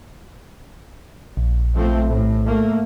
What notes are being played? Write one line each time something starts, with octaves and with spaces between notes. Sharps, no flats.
A#1
F3 A3 C4
A2
A3 A#3